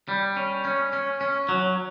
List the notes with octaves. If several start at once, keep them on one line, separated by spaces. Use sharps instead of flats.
G3
C#4
C#4
C#4
C#4
F#3